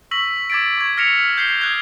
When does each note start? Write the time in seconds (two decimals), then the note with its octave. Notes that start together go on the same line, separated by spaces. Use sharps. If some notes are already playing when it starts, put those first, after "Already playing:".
0.11 C#6 E6 A#6 B6 F#7
0.50 D6 G#6 A6 B6 D7
0.78 C#6 G#6
0.97 F6 A#6 B6 C#7 E7 F7
1.38 G6 C7 G7
1.61 D#6 F#6 G#6